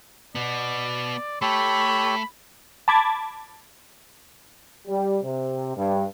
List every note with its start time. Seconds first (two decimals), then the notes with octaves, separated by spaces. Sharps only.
0.35 B2 B3 D5
1.42 A3 G4 A4 C#5 B5
2.88 A5 B5 D6 G#6 A6
4.87 G3
5.22 C3
5.76 G2